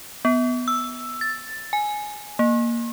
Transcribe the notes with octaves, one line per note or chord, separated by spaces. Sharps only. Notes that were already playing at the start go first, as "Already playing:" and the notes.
B3
E6
A6
G#5
A#3